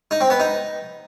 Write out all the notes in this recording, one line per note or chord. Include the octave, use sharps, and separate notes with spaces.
D#4
C4
B3
D#4